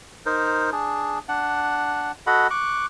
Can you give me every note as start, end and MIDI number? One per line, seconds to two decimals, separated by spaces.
0.26 0.70 63
0.26 0.70 70
0.26 0.70 72
0.72 1.19 62
0.72 1.19 68
1.29 2.12 62
1.29 2.12 78
2.27 2.47 66
2.27 2.47 69
2.27 2.47 75
2.27 2.47 78
2.27 2.47 83
2.50 2.86 85
2.50 2.86 86
2.50 2.86 90